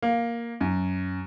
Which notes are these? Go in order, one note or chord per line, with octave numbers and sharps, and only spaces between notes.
A#3
F#2